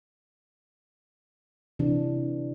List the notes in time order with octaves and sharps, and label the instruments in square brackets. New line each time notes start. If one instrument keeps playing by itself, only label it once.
[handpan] C3 E3 D4